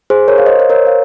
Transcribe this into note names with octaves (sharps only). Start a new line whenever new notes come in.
G#4 C5
A#4 C#5
F5
C5 D#5
C5
A#4 C#5
F5